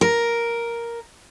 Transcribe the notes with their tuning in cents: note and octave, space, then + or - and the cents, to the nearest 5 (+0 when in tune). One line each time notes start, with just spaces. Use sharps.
A#4 +5